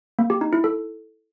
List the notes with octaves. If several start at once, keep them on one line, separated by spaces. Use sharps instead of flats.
A#3
G4
D#4
E4
A4